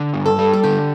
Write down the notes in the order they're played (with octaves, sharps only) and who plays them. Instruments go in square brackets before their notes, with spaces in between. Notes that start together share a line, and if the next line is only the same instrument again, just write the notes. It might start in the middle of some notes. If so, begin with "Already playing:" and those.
Already playing: [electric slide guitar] D3
G2
[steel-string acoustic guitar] A4
[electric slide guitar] G3
[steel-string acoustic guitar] A4
[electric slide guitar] D3 [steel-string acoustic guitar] G4